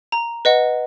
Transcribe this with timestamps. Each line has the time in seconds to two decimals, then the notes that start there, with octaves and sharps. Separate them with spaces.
0.12 A#5
0.45 B4 D#5 F#5